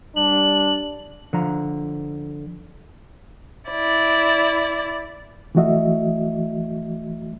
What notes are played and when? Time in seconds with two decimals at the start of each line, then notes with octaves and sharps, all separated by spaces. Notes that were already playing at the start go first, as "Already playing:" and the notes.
0.16 G3 D4 F#7
1.33 D3 F3 A#5
3.69 E4 D5
5.55 E3 F3 A3 F#4 D#5 E5